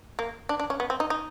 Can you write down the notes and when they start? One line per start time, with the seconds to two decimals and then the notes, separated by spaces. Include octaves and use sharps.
0.19 A#3
0.49 D4
0.60 D4
0.70 C#4
0.80 B3
0.90 C4
1.00 D#4
1.10 D#4